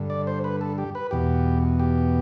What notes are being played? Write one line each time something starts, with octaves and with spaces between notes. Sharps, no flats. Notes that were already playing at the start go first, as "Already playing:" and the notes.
Already playing: G2 D3
D5
C5
B4
A4
G4
B4
E2 B2 G4
G4